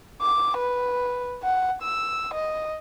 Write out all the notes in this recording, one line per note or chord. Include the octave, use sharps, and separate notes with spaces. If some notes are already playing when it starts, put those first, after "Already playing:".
D6
B4
F#5
E6
D#5